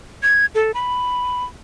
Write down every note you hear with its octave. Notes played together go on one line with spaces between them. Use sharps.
G#6
A4
B5